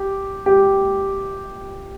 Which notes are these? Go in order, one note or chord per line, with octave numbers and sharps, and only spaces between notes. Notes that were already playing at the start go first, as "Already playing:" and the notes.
Already playing: G4
G4